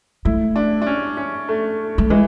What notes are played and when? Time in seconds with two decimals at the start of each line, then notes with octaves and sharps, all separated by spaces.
0.25 A3 E4
0.56 D4
0.82 D4
0.86 C#4
1.17 C#4
1.49 A3
1.98 A3
2.10 E3 G#3